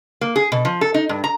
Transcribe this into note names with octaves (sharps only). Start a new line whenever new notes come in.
A#3
G#4
B2
F3
A4
D#4
G2
A#5